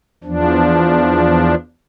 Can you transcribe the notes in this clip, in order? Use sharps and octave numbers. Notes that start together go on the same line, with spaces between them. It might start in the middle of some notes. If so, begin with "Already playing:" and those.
E2 F3 D4